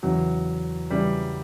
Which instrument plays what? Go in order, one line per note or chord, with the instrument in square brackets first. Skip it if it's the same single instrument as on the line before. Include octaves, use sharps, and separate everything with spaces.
[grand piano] E2 C#3 E3 F#3
C#3 E3 G3